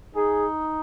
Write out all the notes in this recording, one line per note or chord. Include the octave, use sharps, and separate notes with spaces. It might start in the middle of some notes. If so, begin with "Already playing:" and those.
D#4 G#4